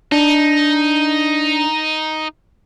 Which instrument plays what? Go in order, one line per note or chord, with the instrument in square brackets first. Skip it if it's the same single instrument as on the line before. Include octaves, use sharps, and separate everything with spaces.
[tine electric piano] D4 [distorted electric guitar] D#4